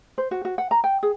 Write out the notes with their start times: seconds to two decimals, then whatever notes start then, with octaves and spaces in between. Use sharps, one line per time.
0.18 C5
0.31 F#4
0.45 F#4
0.58 F#5
0.71 A#5
0.84 G5
1.03 G#4